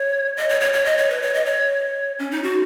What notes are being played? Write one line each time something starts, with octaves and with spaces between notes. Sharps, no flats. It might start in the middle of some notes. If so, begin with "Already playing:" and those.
Already playing: C#5
D#5
C#5
C#5
C#5
D#5
C#5
B4
C#5
D#5
C#5
C#4
D#4
F#4